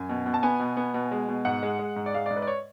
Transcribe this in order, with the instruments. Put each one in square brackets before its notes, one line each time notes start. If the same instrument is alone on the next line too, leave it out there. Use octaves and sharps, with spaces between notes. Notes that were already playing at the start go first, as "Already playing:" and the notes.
Already playing: [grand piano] F#2 G#5
B2
B2
A5
B3 G#5
B2
B3
B2
G#3
B2
G#2 F#5
G#3
G#3
G#2
D5
G#3 F5
G#2 D5
B4
D5
C#5